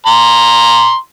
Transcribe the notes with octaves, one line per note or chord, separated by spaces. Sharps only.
A#5 C6